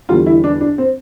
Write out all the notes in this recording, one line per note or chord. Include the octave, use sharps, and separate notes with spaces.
E2 D3 G3 F4
E4
D4
D4
C4